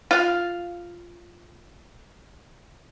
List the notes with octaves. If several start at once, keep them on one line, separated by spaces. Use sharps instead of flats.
F4 F5